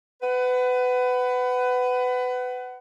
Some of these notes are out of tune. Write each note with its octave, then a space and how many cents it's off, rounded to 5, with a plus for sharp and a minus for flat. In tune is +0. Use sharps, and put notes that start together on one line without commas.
B4 +25 F#5 +20